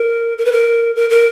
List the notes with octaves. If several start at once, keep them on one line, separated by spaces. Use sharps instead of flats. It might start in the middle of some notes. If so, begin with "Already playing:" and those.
Already playing: A#4
A#4
B4
A#4
A#4
A#4